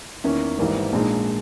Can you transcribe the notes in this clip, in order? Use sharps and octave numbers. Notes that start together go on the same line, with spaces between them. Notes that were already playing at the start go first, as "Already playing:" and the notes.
E2 D#3 A#3 C#4 E4
G#1 G#2 E3 G3 A#3
A#1 A#2 G#3 D#4